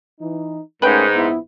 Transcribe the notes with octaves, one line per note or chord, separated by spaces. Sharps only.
E3 D#4
G#2 A3 C#4 A#4 B4 G5
A#1 B3 E4